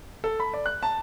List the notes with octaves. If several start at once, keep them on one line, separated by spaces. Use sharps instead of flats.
A4
B5
D5
F#6
A5